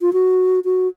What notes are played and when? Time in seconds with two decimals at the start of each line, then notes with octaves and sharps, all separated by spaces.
0.02 F4
0.13 F#4
0.65 F#4